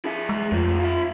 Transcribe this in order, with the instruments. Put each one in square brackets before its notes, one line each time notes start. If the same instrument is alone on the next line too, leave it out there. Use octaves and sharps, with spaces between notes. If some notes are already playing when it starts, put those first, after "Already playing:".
[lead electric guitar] G#4 E5
[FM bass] G#3
[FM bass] F2 [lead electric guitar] A3 F4
[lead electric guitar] F4 E5